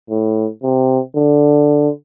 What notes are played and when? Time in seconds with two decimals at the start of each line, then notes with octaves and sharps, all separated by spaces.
0.10 A2
0.63 C3
1.15 D3